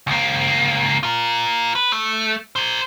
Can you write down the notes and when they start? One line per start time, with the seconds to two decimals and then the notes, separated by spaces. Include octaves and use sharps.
0.07 C#2 A#3
1.03 F4 A#4
1.75 B4
1.92 A3
2.56 A#4 C5